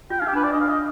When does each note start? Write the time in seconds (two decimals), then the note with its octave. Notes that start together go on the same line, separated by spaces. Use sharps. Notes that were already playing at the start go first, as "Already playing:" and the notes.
0.10 F4 G5
0.19 F5
0.22 D#4
0.28 G4
0.33 D4 B4
0.44 D5
0.52 D4 D#5
0.61 F5
0.69 D#5